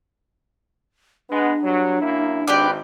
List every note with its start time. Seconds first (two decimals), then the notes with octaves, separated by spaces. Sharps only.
1.30 G#3 B3 D4
1.63 G2 F#3
2.01 F#2 A#3 E4
2.47 G#1 G4 B4 D5